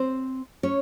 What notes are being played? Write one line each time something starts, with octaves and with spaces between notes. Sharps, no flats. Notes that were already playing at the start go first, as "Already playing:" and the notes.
Already playing: C4 C5
C#4 C#5